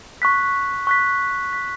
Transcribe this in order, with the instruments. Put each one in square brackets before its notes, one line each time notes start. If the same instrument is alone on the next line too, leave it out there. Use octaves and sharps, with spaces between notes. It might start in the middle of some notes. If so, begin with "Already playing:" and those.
[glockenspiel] C#6 F#6 B6
C#6 F#6 B6
C#6 F#6 B6